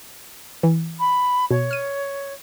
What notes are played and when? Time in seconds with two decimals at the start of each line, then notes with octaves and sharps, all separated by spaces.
0.63 E3
0.99 B5
1.51 B2 C#5
1.71 F6 D#7